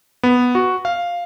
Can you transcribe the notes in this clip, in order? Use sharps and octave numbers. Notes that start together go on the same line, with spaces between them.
B3
F#4
F5